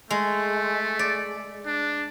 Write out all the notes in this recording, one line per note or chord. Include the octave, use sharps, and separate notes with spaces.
G#3 A3
D5
D4